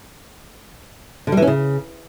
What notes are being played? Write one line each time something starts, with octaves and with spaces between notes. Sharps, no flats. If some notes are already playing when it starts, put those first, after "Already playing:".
D3
G3
E3
C#4
C#3